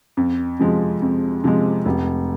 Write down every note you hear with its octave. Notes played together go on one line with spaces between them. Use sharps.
F2
C3 F3 G#3
F2
C3 F3 G#3
F1